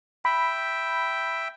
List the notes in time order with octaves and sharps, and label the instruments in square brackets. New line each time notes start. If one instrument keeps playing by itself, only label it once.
[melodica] E5 G5 [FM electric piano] B5